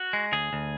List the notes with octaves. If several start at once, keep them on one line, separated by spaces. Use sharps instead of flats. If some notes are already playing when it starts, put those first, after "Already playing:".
Already playing: F#4
G#3
D2 G#4
D2